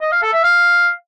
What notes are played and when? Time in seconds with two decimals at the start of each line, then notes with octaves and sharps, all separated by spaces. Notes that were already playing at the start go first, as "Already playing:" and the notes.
0.02 D#5
0.12 F5
0.23 A4
0.33 E5
0.44 F5